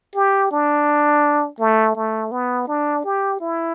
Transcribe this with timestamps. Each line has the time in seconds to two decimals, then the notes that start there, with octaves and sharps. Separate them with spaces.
0.15 G4
0.52 D4
1.59 A3
1.96 A3
2.31 B3
2.68 D4
3.05 G4
3.40 E4